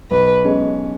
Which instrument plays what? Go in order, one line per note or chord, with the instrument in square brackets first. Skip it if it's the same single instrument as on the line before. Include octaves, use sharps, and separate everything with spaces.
[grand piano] B1 [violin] B4
[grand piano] B2 G#3 C#4